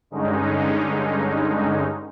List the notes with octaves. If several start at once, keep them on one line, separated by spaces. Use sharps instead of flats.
G2 D3 G#3 C#4 D#4